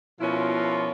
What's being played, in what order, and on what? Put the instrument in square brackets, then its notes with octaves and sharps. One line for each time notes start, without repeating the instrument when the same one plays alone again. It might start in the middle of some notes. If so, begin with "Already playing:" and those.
[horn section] B2 F3 C#4 E4 F4 A#4